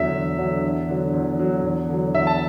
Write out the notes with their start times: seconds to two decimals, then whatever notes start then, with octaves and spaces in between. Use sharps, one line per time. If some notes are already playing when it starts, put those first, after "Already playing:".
Already playing: E2 D3 F#3 E5
0.13 E2
0.38 D3 F#3
0.63 E2
0.89 D3 F#3
1.13 E2
1.39 D3 F#3
1.63 E2
1.89 D3 F#3
2.14 E2 E5
2.27 A5